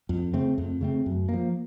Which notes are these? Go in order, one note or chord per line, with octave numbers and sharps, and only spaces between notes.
F2
C#3 A3 C4
F2
C#3 A3 C4
F#2
F3 A#3